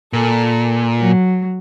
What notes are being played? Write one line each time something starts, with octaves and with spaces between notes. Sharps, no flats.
A#2 A4
F#3